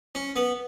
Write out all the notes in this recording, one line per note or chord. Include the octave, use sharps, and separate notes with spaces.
C#4
B3